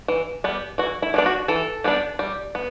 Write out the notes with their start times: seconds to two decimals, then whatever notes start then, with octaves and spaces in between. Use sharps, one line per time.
0.08 E3
0.44 G3 B3
0.78 E3 F#4
1.02 E4
1.14 G3 B3 D4
1.26 F#4
1.48 E3 A4
1.84 G3 B3 D4
2.19 G3
2.55 B3